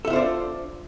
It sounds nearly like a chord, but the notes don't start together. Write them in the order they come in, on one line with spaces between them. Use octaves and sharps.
A4 E5 F4 C5 D4